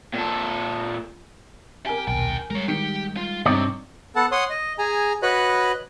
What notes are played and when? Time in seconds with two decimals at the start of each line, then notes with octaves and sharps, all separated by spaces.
0.14 A#2 A4
1.86 G4 A#4 G#5
2.07 D#1 B1 G2 G5
2.51 G3 G#3 A#4 C#5
2.68 D#3 G4 C#7
3.17 F4
3.46 G2 C3 C4 D#4 C#5 D5
4.16 B3 A4 F#5 A5
4.32 C#5 F#5 C6 D#6
4.50 D#5
4.79 G#4 G#5 A#5
5.23 F#4 B4 C#5 D#5 B5 F#6